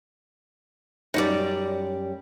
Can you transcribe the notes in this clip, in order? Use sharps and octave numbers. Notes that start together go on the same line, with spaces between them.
F#2 G3 D#4 F#4 D5